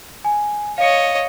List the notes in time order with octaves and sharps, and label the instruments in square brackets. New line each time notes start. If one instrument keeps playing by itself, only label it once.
[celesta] G#5
[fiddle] C#5 D#5 [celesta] F5 C#7